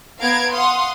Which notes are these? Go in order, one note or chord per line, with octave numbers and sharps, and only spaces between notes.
B3 F5 A#5 G#6 D7
F5 F#5 C6 D#6